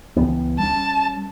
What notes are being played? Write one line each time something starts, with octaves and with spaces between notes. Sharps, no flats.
C#2 E3 B3
G3 C#4 A5